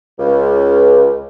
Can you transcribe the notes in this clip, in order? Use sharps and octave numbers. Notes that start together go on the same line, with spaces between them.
C#2